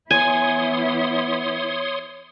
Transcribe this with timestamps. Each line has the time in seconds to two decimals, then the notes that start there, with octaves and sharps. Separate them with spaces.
0.11 E3 B3 E4 C#5 G#5 C6 D#6